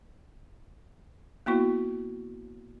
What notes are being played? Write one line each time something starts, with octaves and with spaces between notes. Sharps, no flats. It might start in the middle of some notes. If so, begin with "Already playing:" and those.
A#3 B3 E4 F#4